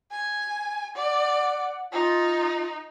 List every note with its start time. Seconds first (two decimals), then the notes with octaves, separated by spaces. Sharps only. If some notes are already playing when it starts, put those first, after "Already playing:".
0.11 G#5
0.96 D5 F#5
1.92 D#4 F4